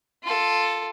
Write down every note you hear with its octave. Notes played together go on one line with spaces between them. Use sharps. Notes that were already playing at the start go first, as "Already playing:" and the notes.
F4 A4